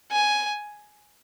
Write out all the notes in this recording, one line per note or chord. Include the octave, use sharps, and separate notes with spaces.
G#5